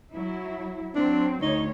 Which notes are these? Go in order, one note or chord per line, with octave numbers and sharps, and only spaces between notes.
F#3 E4
F#3 C4 D4
D2 D#4 C#5